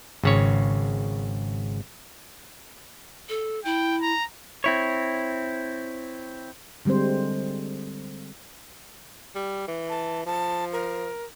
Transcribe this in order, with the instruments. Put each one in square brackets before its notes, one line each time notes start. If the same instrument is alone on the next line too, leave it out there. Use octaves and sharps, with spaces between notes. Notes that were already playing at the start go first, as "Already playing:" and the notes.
[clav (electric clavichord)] G#1 C#3 C#5
[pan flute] A4
[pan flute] E4 [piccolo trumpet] G5
[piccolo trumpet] A#5
[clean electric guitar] C4 E4 C#5
[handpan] D3 G3 G#3 C4 C5
[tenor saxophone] G3
E3
[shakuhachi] A5
[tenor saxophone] F3 [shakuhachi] A5
[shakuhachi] A#4